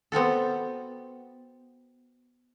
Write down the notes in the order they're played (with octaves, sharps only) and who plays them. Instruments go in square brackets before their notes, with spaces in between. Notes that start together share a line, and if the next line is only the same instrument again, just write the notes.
[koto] B3 C4 F#4 A4